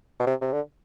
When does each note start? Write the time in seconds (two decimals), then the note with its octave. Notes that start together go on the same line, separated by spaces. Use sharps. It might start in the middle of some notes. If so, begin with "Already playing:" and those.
0.20 B2
0.26 C3
0.42 C3
0.52 D3